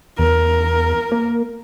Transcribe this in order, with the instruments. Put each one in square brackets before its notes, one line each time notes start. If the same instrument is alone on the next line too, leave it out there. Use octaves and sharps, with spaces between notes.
[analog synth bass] E2 [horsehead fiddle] A#4
[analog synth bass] A#3